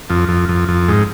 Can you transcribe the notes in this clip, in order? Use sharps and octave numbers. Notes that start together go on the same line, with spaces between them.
F2
F2
F2
F2
G#2